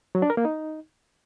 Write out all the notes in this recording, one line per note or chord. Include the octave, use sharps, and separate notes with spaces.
F#3
D4
A#4
A#3
D#4